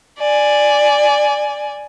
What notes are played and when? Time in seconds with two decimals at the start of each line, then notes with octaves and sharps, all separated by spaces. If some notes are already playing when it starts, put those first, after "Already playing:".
0.19 D5 G#5